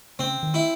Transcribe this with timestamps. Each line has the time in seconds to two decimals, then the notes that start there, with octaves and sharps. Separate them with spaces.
0.19 C#3 C4
0.43 D#3
0.54 E4